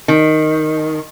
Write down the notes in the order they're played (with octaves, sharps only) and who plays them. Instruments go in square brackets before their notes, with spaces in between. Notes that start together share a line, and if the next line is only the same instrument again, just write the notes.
[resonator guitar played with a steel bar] D#3